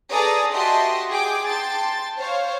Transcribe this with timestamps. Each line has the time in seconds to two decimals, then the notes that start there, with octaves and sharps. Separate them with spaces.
0.12 G#4 A4 B4 D5 A#5 D#6
0.54 F#4 G4 D#5 E5 A5 C6
1.10 G#4 G5 D6
1.49 G5 A5 C6 A6
2.17 C5 C#5 F5